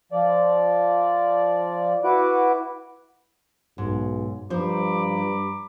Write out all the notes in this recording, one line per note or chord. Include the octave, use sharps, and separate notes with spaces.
F3 D5
E4 F#4 B4 D6
B1 G#2
G2 F3 C5 A#5 B5 D6